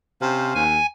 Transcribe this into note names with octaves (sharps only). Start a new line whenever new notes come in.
C3 C#4 C5 F5
D#2 G#5